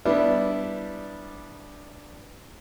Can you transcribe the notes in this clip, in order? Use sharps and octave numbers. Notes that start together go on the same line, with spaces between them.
G3 B3 D4 E4